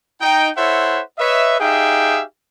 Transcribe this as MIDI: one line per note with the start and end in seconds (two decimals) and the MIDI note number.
0.21 0.49 63
0.21 0.49 79
0.56 1.01 64
0.56 1.01 69
0.56 1.01 72
0.56 1.01 73
0.56 1.01 76
0.56 1.01 78
1.18 1.56 71
1.18 1.56 73
1.18 1.56 75
1.18 1.56 76
1.60 2.22 63
1.60 2.22 67
1.60 2.22 68
1.60 2.22 76
1.60 2.22 77
1.60 2.22 79